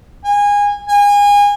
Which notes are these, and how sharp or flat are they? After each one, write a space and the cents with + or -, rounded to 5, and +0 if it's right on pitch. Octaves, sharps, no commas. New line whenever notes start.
G#5 -25
G#5 -30